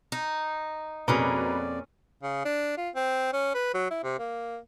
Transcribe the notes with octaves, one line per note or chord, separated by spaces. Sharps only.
D#4
F2 B2 A#3 C#4 G#4 B4 D5 A#5
C#3
D4
F4
C4
C#4
B4
F#3
E4
C3
A#3